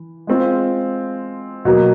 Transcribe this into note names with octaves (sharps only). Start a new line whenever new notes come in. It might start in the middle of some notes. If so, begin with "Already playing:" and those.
Already playing: E3
G#3 C4 F4
B2 F#3 A#3